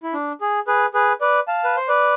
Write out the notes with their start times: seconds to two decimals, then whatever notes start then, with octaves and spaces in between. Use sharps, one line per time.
0.03 E4
0.14 D4
0.41 G#4
0.67 G#4 B4
0.94 G#4 B4
1.21 B4 D5
1.48 F5 A5
1.64 B4
1.77 C5
1.88 B4 D5